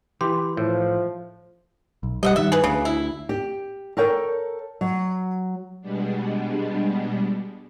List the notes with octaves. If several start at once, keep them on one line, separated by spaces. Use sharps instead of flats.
E3 G4 C6
A2 F3
B1
G3 D#5 E5 F#5
G2 D#3 G3 E5
G#4 B4
D2 C#3
E4
G4
A4 A#4 C#5 G5
F#3
B2 G3 G#3 B3 D4